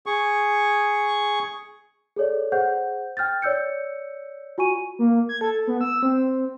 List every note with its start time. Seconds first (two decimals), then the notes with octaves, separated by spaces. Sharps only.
0.06 G#4 C#6
2.16 G#4 A4 C#5 D5
2.52 G#4 C5 F#5 G6
3.17 G5 F6 G6 A6
3.42 C#5 D5 E6 G6 C#7
4.58 F4 F#4 G#5 C#6 D#7
4.99 A#3
5.29 G#6
5.41 A4
5.67 B3
5.81 E6
6.03 C4